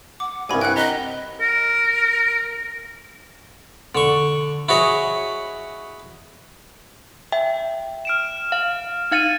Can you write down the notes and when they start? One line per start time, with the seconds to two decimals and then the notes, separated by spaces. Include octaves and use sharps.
0.20 F#5 D6
0.49 C2 G2 G#5 B5 C#6
0.61 F#5 G5 F#6
0.76 D#5 A#5 B5
1.41 A#4
3.95 D3 C#6
4.69 E4 F#4 G#4 C#5 D#5
7.32 E5 G5
8.05 F6 D7 E7
8.52 F5
9.11 D#4 F5 F6 A6 C#7 D#7